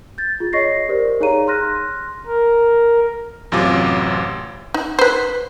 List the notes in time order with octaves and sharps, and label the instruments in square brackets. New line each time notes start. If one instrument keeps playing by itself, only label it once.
[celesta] G6 A6
F4 G#4
C#5 D#5 C#6 A#6 C7
G4 A#4 C5 D5
D#4 G#4 C#5 F5 A#5 D#7
C6 F6 F#6 A#6
[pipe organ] A#4
[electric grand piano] A1 F#2 C3 F4 D6
[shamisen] D#4
B4 C5